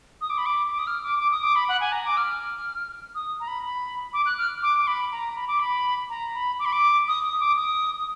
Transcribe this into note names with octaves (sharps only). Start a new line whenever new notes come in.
D#6
D6
B5
D6
D6
D#6
F6
D6
D6
D#6
D6
B5
F#5
G#5
A#5
D6
F6
D#6
A#5
B5
B5
D6
F#6
F6
D6
D6
B5
A#5
B5
D6
B5
A#5
B5
D6
B5
D6
D#6
D#6
D6
D#6